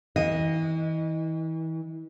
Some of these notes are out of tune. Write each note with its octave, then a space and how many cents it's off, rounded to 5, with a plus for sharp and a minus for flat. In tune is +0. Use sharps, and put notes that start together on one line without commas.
E3 -35 D#5 -5